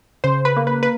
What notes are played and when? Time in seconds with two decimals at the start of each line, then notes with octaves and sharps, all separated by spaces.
0.24 C#3 C5
0.45 B4
0.56 A#3
0.67 B4
0.83 B4